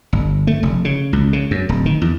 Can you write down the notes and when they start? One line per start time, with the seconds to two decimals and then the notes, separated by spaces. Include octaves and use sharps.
0.13 G1
0.47 A3
0.63 F1
0.85 C#3
1.13 C#2
1.33 C#3
1.51 F#2
1.69 D1
1.86 D#3
2.01 E2